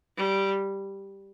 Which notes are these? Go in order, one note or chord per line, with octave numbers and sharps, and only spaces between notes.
G3